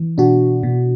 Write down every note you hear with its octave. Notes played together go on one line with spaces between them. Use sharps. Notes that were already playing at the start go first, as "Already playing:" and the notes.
Already playing: E3
B2 D4 F#4
B2